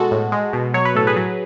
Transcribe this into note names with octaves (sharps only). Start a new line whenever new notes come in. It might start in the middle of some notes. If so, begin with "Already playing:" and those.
Already playing: B2 G#3 F#4 A4
A2
G#3
B2
F#3 C#5
B4
A2 A4
G#4 B4
F#3